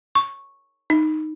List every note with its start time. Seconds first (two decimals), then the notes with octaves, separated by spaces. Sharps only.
0.15 C#6
0.90 D#4